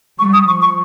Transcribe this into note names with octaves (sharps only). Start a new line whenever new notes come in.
G3 C#6
D#6
F3 C#6
C#6